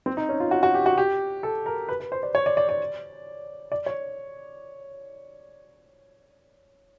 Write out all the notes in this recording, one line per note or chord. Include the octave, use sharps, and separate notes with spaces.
C4
D#4
C#4
F4
F#4
F#4
G4
F#4
G4
A4
A#4
B4
B4
C5
D5
C#5
D5
D5
D5
D5
C#5